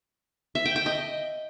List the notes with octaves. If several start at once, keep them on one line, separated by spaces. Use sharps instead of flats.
E5
G5
G5
D#5